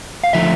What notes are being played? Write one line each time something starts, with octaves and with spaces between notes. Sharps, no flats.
F5
D3 F3 A3 E5